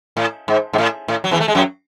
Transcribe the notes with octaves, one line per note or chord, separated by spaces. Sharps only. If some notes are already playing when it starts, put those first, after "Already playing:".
A2
G#2
G#2
A2
A2
F#3
E2 E3
A3
G#3
F#2 F#3